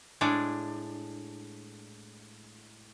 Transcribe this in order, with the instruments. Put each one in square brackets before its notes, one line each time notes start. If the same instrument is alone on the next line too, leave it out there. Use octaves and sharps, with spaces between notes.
[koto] A2 G#3 D4